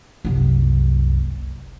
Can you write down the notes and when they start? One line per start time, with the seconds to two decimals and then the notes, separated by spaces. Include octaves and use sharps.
0.25 F#1 C2